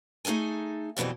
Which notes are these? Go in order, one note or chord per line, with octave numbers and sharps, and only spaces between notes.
A3 D#4 G#4 A4 G#5
F2 B2 E3 G3 C4